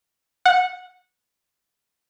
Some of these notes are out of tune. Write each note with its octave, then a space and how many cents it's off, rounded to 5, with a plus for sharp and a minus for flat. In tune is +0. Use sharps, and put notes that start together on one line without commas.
F#5 -15